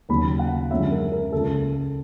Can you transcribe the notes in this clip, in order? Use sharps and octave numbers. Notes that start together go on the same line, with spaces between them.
D#2 C#3 F#3 B5
F#5
F#2 D3 F3 G#3 C#4 E5
A#4
A#4
C#2 C#3 F3 A4